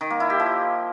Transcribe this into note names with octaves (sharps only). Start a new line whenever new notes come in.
D#3
A#3
E4
G4
F3